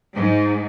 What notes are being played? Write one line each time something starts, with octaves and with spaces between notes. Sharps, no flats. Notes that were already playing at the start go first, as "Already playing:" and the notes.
G#2